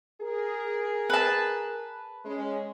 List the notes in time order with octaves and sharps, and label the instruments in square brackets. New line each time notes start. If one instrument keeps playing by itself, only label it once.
[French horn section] G#4 A#4
[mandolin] B4 A5
[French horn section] G#3 C#4